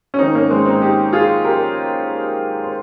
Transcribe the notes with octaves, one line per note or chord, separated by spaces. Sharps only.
C#4
G#2 D#3 C4 D#4
A#3 C#4
G#3 C4
C4 D#4
D#4 G4
F4 G#4
G4 A#4
C5